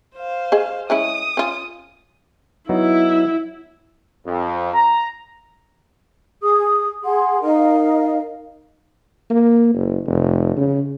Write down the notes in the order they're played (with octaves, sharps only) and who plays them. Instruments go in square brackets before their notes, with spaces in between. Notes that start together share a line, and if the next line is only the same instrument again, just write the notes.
[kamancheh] C5 F5
[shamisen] G#4 D#5
[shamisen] G#3 C#4 E4 [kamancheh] D#6
[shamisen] C#4 F4
[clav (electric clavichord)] F#3 B3 D#4 [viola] E4
[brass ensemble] F2
A#5
[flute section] G#4 D#6
G#4 F#5 C6
D#4 A#4 D#5 F5
[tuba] A#3
F#1
F1
C#3